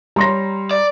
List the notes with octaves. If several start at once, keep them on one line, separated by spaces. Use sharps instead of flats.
G3 C#5 A#5 C6 A#6
D5